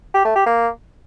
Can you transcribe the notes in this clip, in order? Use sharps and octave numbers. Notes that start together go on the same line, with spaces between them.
G4
A3
G4
A#3